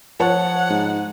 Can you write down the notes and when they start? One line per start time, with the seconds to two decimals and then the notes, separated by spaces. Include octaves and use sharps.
0.20 F3 C#5 F#5 A5
0.70 G#2